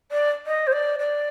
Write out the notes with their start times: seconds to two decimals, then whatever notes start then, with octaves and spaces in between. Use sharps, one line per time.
0.11 D5
0.46 D#5
0.67 C5
0.72 D5
0.99 D5